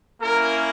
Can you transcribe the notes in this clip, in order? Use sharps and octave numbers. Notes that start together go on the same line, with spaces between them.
A#3 C#4 E4 A#4